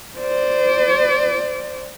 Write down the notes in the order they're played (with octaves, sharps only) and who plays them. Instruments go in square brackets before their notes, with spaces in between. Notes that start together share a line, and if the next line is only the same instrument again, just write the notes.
[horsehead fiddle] C5 D5